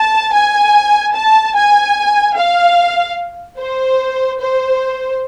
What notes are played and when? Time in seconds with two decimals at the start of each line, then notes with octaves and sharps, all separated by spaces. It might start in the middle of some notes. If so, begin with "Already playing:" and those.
Already playing: A5
0.33 G#5
1.15 A5
1.55 G#5
2.36 F5
3.58 C5
4.39 C5